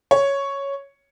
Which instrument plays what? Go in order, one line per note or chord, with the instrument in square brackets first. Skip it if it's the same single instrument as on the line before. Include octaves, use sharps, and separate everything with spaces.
[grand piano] C#5